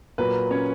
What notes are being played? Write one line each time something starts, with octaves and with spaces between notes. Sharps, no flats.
A#2 F#3 A#3 B4
C#4 C#5